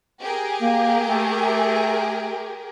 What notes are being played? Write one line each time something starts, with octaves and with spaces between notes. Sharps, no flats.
G4 G#4 A#4
A#3
A3